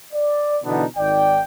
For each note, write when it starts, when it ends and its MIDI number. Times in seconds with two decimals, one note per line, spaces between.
0.12 0.58 74
0.64 0.85 47
0.64 0.85 50
0.64 0.85 52
0.64 0.85 59
0.64 0.85 62
0.64 0.85 63
0.96 1.41 32
0.96 1.41 51
0.96 1.41 74
0.96 1.41 79